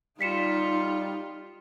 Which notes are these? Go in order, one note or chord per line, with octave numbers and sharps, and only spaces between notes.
G3 D#4 F4 B6 C#7 E7